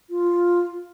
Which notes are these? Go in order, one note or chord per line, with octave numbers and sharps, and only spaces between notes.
F4